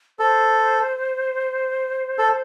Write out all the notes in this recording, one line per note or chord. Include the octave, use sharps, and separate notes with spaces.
A4 C5
A4